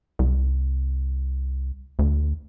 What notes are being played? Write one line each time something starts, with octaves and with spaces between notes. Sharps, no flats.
C2
D2